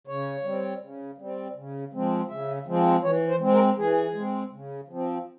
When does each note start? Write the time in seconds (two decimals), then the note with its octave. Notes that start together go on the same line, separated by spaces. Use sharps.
0.07 C#3 C#5
0.44 G3 C4
0.81 C#3
1.18 G3 C4
1.55 C#3
1.93 F3 G#3 C4
2.29 C#3 E5
2.67 F3 G#3 C4
3.03 E3 C#5
3.28 C5
3.40 G#3 C4
3.53 A#4
3.77 E3 G#4
4.14 G#3 C4
4.51 C#3
4.89 F3 C4